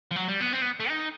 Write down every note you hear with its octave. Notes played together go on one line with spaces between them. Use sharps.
F3
F#3
G3
B3
C4
B3
A3
D#4